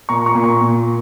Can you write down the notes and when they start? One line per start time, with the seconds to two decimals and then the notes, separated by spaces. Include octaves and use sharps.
0.09 A#2 A#5 C#6
0.26 A#5 C#6
0.35 A#2
0.43 A#5 C#6
0.61 A#2